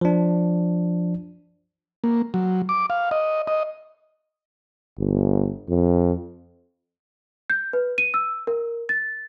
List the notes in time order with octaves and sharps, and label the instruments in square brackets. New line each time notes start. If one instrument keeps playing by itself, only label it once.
[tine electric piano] F3 D4
[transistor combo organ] A#3
F#3
D6
F5
D#5
D#5
[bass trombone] G1
F2
[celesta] G6
B4
D#7
E6
A#4
A6